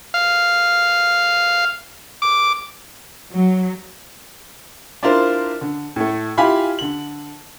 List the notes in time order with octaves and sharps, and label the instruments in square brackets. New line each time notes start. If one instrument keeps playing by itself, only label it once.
[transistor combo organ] F5
D6
[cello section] F#3
[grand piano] D4 E4 F4 A#4 C5
D3
A2 A3
E4 F4 G4 F5 G#5 B5
D3 F#7